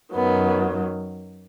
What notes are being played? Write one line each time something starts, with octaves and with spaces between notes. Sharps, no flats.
F#2 D#3 F#3 B3